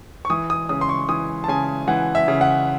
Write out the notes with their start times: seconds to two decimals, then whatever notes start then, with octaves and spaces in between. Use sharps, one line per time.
0.25 C#6
0.30 E3 D#6
0.50 D#6
0.69 C#3 D#6
0.81 C6
0.89 C#6
1.09 E3 D#6
1.44 A5
1.48 C#3 G#5
1.88 E3 F#5
2.15 E5
2.28 C#3
2.41 F#5